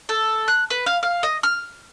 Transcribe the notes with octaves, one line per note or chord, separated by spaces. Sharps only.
A4
F#6
B4
F5
F5
D#5
F6